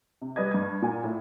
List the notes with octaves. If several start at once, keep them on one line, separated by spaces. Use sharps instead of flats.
C3
G3 B4 D#5 G#6
G2 G#6
A#2 G#5
A2